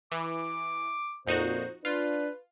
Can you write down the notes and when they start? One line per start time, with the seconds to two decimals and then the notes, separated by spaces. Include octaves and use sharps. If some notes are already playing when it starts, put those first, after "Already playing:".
0.12 E3 D6
1.27 F2 A#2 D#4 F#4 C5
1.85 D4 F4 B4